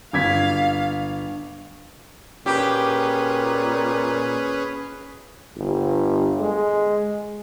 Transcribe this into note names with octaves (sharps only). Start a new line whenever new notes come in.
G1 F5 G#6 B6
A#2 C#4 G4 G#4 B4
G1
G#3